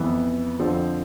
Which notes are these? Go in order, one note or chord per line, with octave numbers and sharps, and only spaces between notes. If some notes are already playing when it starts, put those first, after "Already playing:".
Already playing: F2 E3 B3
F2 D3 F3 C4